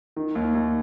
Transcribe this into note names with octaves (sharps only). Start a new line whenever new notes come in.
D#3
D#2
D#2